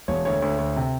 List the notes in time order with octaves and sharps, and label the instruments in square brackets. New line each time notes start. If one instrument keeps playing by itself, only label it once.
[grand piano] E1 C#5
D2 C#5
D2
D2
C3